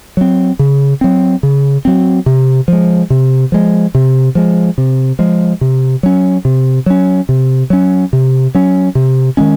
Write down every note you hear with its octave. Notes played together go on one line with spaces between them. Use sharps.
F#3 C4
C#3
F#3 C4
C#3
F#3 C4
C3
F3 G#3
C3
F3 G#3
C3
F3 G#3
C3
F3 G#3
C3
F#3 C#4
C3
F#3 C#4
C3
F#3 C#4
C3
F#3 C#4
C3
D#3 G#3 C#4